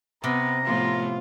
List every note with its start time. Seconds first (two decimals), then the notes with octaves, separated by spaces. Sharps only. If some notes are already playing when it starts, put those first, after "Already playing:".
0.24 C3 B3 A#5
0.65 A2 F3 B3 F4